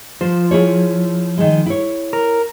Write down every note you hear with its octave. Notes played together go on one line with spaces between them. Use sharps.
F3 C5
E4 G#4 C#5
D#3 G#3
E4 C#5
A#4